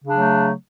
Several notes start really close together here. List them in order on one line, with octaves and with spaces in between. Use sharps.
C#3 D4 F#3 A3